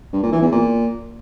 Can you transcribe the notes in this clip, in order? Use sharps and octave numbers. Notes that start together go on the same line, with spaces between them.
G2
A#2
E3
E2
A#2